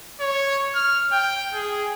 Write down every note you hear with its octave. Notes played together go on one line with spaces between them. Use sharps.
C#5
F6
G5
G#4